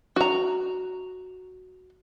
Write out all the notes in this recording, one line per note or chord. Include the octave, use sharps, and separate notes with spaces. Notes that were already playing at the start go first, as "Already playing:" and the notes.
F#4 A#5